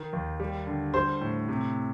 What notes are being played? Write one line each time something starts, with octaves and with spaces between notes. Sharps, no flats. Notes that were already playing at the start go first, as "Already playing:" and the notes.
Already playing: D#3
D#2
G3
D3
G3 C5
A2
C3